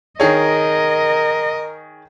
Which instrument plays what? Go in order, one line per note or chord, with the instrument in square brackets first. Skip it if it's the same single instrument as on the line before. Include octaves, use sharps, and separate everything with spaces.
[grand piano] D#3 G#4 C#5 [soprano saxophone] A#4 [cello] D#5